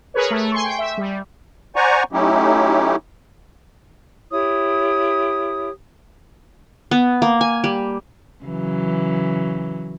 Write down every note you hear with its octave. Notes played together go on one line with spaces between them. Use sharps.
G#4 A#4 B4 C#5
A3
G#5 C6 C#6
G5
E5
G3
C5 D5 F#5 G#5 A#5 C#6
F#3 A3 C#4 D#4 E4 G4
E4 G4 C#5 D#6
B3
A#3
G#5
G3
C#3 E3 F#3